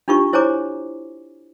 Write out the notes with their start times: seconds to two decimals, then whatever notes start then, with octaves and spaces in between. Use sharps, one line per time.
0.08 D4 D#4 F4 G4 C#6
0.33 E4 C5 C#5 G#5 A#5 D6